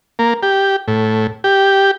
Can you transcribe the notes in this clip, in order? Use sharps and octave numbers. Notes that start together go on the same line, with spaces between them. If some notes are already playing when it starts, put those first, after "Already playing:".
A#3
G4
A2
G4